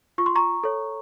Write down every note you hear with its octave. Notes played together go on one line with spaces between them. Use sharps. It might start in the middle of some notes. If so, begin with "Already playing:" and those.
F4 C#6
C6
A#5 C#6
A4 C#5